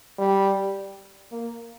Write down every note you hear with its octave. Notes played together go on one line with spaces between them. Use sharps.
G3
A#3